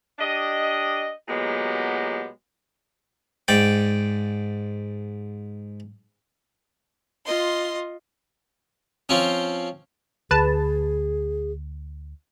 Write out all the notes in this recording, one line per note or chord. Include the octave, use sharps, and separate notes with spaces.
D4 G4 D#5
A#2 F#3 G#3 B3 G4
G#2 D5 G5
F4 D#5 C6
F3 C4 C#4
D2 G#4 B4 A5